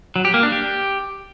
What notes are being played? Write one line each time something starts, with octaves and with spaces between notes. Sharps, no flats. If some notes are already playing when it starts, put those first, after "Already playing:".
F#3
G4
A#3
D4
G4